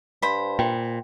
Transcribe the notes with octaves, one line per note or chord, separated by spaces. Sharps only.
G2 C5 B5
A#2 G5